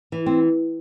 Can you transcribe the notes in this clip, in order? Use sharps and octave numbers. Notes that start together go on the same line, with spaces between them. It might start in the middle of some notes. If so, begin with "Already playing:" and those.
E3
C4